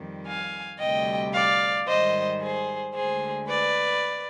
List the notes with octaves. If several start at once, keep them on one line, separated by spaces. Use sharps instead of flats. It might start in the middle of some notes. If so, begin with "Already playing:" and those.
Already playing: F2 D#3 G3
F5 G#5
D2 C3 G3 D#5 G5
D5 F5
G#2 D#3 G3 C5 D#5
G#4 C5
D2 D3 G#3 G#4 C5
B4 D5